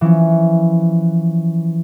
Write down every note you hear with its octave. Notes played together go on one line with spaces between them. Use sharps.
E3 F3 C#4